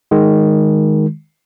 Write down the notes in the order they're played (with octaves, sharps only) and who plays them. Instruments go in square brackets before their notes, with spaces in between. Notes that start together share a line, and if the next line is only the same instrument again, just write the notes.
[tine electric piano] D#3 G#3